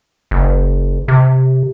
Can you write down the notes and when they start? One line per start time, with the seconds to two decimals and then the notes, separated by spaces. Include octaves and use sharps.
0.31 F#1
1.08 C3